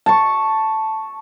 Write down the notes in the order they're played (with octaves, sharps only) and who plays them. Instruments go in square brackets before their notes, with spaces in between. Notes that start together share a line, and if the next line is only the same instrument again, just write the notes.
[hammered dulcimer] A5 C#6